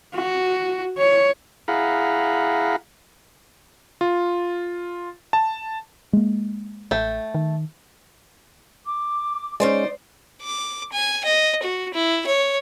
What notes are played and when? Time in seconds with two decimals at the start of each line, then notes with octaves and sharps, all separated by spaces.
0.15 F#4
0.98 C#5
1.68 E4 G#4 F5 F#5 A#5 B5
4.01 F4
5.33 A5
6.13 G#3 A#3
6.91 A1 A3 G5
7.35 D#3
8.86 D6
9.60 G#3 C#4 D#4 C5 D5
10.42 D6
10.92 G#5
11.25 D#5
11.63 F#4
11.94 E4
12.26 C#5